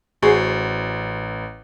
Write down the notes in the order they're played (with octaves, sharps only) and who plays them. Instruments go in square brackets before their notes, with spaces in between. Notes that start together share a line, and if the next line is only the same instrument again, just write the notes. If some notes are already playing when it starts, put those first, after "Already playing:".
[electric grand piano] A1 [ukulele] F#4 G#4 C5